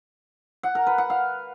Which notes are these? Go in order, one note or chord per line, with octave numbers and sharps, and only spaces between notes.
F#5
A#4
B4
F#5
F5